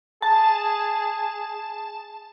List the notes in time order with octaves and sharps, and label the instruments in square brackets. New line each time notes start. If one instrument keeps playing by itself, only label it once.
[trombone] G#4 [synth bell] A5